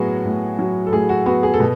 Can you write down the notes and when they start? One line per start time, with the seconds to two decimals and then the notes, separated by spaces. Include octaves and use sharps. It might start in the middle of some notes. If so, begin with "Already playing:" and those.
Already playing: A2 F#3 B3 F#4 G#4
0.25 A2
0.59 F#3
0.87 A4
0.93 A2 G#4
1.09 F#4
1.26 B3 F#4
1.43 G#4
1.54 A4
1.60 B2